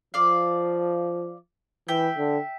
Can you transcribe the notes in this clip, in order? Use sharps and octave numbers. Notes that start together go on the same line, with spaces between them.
F3 D5 F5
E3 E5 G5
D3